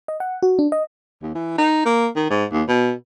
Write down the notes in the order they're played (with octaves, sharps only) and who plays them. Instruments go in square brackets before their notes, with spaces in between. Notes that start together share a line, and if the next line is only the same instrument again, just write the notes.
[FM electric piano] D#5
F#5
F#4
D4
D#5
[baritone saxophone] D#2
E3
D#4
A#3
D#3
G#2
D#2
B2